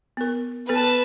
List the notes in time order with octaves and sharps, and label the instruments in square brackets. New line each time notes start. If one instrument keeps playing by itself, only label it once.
[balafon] B3 A#4
[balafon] B3 A4 [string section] B4 A5